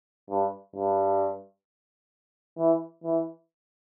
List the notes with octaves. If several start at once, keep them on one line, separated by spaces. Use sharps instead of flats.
G2
G2
E3
E3